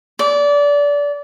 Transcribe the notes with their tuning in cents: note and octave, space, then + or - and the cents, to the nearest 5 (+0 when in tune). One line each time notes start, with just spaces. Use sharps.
D5 -25